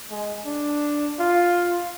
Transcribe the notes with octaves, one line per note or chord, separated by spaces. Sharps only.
G#3
D4
F4